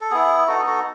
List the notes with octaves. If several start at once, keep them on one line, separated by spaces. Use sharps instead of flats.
A4
B3 E4 G#4
B3 D#4 F#4 A4
F#4 A4